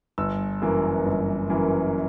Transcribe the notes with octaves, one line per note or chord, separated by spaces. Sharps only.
G1 E6
F#2 E3 A#3
G1
F#2 E3 A#3